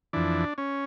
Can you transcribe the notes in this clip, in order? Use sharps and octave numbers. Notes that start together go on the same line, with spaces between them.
F2 E3 D4
C#4